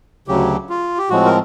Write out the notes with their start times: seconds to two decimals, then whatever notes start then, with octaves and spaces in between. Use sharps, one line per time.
0.28 D2 C#3 F#3 G4
0.69 F4
0.98 G4
1.10 A2 F3 G#3 C4 F#4
1.25 A#4